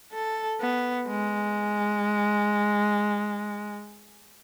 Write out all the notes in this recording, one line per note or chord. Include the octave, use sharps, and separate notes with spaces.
A4
B3
G#3